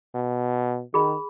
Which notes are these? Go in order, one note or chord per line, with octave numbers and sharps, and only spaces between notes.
B2
D#3 G#4 B5